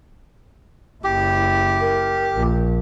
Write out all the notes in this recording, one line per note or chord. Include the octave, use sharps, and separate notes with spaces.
F#1 E4 G4
A#4
A#1